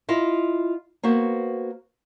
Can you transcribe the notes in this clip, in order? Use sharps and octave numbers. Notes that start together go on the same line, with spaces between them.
E4 F4 D#5
A#3 B3 F#4 C5